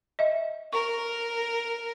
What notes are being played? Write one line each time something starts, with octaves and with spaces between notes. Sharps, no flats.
D#5 E5
A#4 C#6